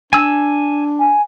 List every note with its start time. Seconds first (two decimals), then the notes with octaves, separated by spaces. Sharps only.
0.13 D4 G#5 E6
1.00 G#5